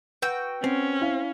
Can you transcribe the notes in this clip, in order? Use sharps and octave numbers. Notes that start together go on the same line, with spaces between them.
F#4 B4 G5 E6
C4 C#4
E4 F5